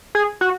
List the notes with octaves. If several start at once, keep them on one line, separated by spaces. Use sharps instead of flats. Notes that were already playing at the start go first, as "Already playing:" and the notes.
G#4
F#4